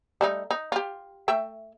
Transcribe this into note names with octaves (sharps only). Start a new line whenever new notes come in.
G3 A3 D#4
D#4
F4 G4
A3 E5 G5